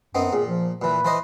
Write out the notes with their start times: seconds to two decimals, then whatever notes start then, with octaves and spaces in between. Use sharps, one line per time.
0.15 F#2 B3 C4 D#4
0.33 A#2 G#4
0.47 F3
0.82 A#2 E3 B4
1.05 E3 C5 D#5